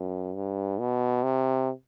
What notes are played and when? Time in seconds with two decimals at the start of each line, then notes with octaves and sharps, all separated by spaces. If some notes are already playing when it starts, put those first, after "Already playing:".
Already playing: F#2
0.35 G2
0.79 B2
1.23 C3